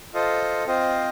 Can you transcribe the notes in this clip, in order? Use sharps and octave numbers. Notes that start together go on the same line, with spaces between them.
F4 A4 C5 D#5
C4 F4 C5 D#5